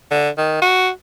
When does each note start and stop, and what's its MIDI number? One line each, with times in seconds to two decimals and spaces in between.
0.11 0.29 50
0.38 0.60 51
0.62 0.89 66